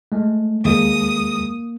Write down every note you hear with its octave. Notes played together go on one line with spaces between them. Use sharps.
G#3 A3
D#2 G#3 A#3 D#6